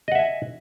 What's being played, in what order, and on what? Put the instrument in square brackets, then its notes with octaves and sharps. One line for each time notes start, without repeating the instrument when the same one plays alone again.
[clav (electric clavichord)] D#5
F#5
E5
G#5